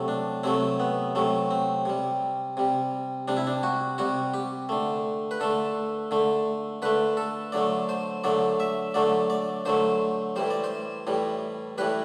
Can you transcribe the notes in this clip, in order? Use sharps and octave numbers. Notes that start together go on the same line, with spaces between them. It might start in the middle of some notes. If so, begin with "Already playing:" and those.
Already playing: C3 F#3 A3
D4
C3 F#3 A3 C4
B3
C3 F#3 A3
C4
C3 G3
C3 G3
C3 G3 D4
E4
D4
F#4
C3 G3 F#4
G4
D3 A3
B4
D3 A3 A4
D3 A3
D3 A3 B4
A4
D3 F#3 A3 D5
C5
D3 F#3 A3 D5
E5
D3 F#3 A3 D5
D5
D3 F#3 A3 C5
A2 E3 G3 C5
D5
C5
A2 E3 G3
A2 E3 G3 B4